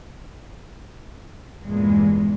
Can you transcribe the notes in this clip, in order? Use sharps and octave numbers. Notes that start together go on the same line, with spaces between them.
E2 G2 A#2 E3 G#3